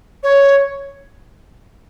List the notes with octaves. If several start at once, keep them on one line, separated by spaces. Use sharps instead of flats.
C#5